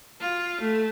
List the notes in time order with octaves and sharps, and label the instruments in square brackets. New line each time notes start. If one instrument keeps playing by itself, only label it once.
[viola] F4
A3